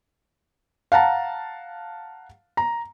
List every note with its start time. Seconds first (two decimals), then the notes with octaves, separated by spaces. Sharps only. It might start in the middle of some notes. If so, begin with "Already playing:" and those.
0.92 F5 F#5 A5 A#5
2.57 A#5